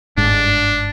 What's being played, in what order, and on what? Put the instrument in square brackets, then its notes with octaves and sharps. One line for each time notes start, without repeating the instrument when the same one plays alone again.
[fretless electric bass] G1 G#2 [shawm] D4